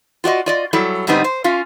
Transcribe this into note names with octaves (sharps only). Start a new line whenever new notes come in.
F4 F#4 D5 D#5
F4 D5 D#5
F#3 G3 E4 A4
G#2 D3 G3 B3 C4 D#4
C5
C#4 F4 F5